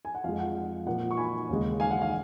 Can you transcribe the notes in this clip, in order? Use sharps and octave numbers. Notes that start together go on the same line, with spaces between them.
G#5
F#5
F2 F3 G#3 F5
F#5
F5
A#2 F3 A#3 F#5
C#6
G#5 B5
D#2 C#3 G#3
F5 G#5
F#5
F5